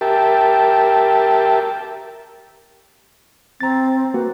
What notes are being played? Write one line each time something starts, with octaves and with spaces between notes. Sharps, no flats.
G4 A#4 E5 G5 A5
C4 A#5 A6
A#3 F#4 B4